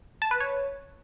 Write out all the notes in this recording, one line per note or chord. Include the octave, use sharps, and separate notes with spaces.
A5
B4
C#5